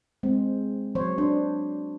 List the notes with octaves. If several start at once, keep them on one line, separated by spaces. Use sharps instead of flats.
G#3 C4
F#3 C5 C#5
D4 C5